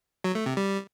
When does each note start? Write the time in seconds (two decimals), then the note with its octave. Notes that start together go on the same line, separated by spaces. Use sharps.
0.24 F#3
0.35 A3
0.46 C3
0.57 G3